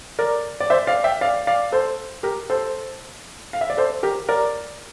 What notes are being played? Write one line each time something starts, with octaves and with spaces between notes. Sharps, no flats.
A#4 D5
D5
C5 E5
D5 F5
E5 G5
D5 F5
D5 F5
A4 C5
G4 A#4
A4 C5
F5
E5
D5
A4 C5
G4 A#4
A#4 D5